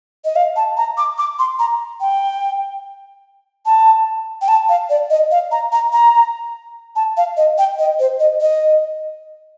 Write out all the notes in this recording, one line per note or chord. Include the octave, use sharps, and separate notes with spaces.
D#5
F5
A5
A#5
D6
D6
C6
A#5
G5
A5
G5
A5
F5
D5
D#5
F5
A#5
A#5
A#5
A5
F5
D#5
G5
D#5
C5
D#5
D#5